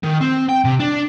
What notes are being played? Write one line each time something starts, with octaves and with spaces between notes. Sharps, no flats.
D#3
C4
G5
C3
D4